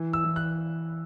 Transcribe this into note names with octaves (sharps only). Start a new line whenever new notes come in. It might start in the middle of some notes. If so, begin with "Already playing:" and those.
Already playing: E3
E6
E3
F#6